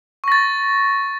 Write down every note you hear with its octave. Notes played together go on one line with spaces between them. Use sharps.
C#6 A6 A#6